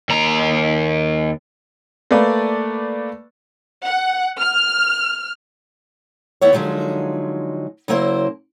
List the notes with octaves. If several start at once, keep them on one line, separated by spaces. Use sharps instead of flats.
D#2 A#5
A3 A#3 B4 D5
F#5
F6
D#2 B3 E4 C#5
D3 F3 F#3 G#3 D#4
C#3 F#3 A#3 E4 C5